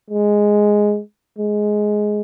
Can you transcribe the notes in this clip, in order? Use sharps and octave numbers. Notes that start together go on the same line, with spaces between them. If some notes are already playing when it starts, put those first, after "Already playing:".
G#3
G#3